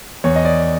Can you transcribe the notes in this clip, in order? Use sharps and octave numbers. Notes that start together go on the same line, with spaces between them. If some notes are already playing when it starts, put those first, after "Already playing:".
E2 C#5
D#5
D5